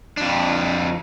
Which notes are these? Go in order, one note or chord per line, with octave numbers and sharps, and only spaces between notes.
F2 D4